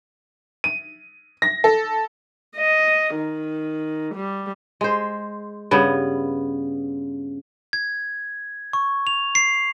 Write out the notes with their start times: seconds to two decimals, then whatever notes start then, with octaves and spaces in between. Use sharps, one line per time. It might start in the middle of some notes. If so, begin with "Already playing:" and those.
0.64 D#7
1.42 A#6
1.64 A4
2.57 D#5
3.16 D#3
4.15 G3
4.81 G#3 C5
5.71 G2 C#3 B3
7.73 G#6
8.73 C#6
9.07 F7
9.35 C7